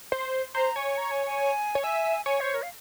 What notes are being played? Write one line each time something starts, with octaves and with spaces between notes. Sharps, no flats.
C5
C5 A#5
C#5 G#5
A#5
G#5
G#5
C#5
E5 G#5
C#5 G#5
C5
A#4
F5